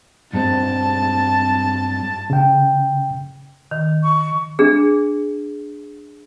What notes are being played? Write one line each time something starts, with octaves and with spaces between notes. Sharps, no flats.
G2 G#3 C4 A5
C#3 G5
D#3
C#6
D4 G#4